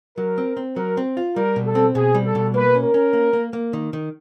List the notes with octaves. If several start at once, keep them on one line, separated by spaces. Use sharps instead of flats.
F#3 A#4
C4
C4
F#3 A#4
C4
F4
G3 A#4
B2
A4
C4
B2 G#4
G3
A4
B2
A#3 B4
C#4
A#4
C#4
A#3
A#3
A#3
D#3
D#3